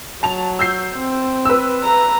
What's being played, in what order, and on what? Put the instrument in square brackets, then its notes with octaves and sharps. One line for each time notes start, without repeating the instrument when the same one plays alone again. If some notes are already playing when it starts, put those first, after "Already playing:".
[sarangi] F#3 [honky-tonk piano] A5 F7
[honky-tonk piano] E6 G6 C7
[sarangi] C4
[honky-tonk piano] B4 E6
[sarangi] A#5